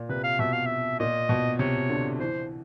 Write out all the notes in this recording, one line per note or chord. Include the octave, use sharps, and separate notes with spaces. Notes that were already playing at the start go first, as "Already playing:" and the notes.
Already playing: A#2
C3 B4
F5
B2 E5
F5
E5
A#2 D#5
B2
C3 C#5
D3
E3 C5